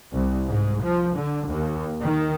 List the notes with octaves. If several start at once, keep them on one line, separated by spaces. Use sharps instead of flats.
C2
G#2
F3
D3
D#2
D#3